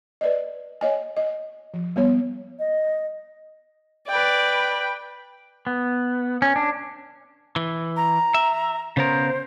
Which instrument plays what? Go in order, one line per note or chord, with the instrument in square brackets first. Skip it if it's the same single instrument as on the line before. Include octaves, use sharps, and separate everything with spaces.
[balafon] B4 D5 D#5
C#5 D#5 G#5
D#5
F3
G3 B3 C#5
[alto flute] D#5
[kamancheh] B4 G5 [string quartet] D5
[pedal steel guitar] B3
C#4
D4
[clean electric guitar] E3
[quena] A#5
[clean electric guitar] E5
[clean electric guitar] C#3 B3 A#4 [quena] C5